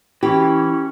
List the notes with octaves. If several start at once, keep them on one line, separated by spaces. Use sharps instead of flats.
E3 C#4 G4